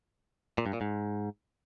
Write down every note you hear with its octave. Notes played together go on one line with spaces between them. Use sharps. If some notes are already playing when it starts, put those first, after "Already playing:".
A#2
G2
A#2
G#2